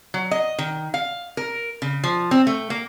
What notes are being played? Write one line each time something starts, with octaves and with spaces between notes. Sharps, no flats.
F#3
D#5
D#3
F5
A#4
C#3
F3
C4
A3
A#3